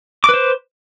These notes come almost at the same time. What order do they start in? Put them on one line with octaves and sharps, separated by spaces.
D6 B4 C5